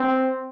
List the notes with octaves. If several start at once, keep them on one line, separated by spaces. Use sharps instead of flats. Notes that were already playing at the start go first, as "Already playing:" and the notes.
Already playing: C4